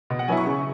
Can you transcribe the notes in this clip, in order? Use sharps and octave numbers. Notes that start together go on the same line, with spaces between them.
B2
F#5
F#3 B3 E4 G#5
C#6
C#3